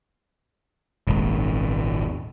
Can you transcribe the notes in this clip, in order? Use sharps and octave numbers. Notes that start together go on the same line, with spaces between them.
D#1 G#1